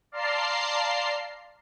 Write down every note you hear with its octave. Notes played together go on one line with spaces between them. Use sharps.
D5 F5 A5 A#5 C6 C7